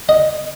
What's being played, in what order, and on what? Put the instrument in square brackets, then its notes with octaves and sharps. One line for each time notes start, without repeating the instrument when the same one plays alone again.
[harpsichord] D#5